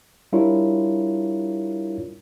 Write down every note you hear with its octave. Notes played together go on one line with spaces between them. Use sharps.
G3 D4 E4 F4 A#4 C#5